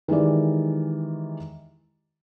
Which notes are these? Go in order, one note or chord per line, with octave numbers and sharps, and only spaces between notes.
D#3 E3 G#3 G4 D5